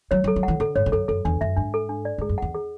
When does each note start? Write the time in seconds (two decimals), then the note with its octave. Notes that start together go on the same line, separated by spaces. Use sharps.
0.11 F#3 C#5
0.24 F#3
0.28 A4
0.36 F#3
0.43 E3 F#5
0.60 D3 A4
0.76 G#2 C#5
0.86 G#2
0.92 F#2 A4
1.08 F#2 A4
1.25 E2 D4
1.41 F#2 E5
1.56 G#2 D4
1.74 A4
1.89 D4
2.05 D5
2.18 G#2 G#4
2.29 F#2
2.38 E2 F#5
2.54 G#4